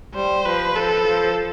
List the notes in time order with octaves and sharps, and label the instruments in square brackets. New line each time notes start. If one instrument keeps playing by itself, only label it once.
[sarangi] G3 [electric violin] C5
[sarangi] F3 [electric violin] B4
[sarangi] F3 [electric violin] A4
[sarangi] F3